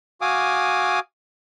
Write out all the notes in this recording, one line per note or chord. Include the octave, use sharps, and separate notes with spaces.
F#4 F5 G#5 D6 D#6